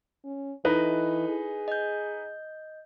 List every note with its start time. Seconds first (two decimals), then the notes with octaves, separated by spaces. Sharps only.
0.25 C#4
0.65 E3 D#4 E4 A4 B4 D#5
1.29 G#4
1.68 D#5 G6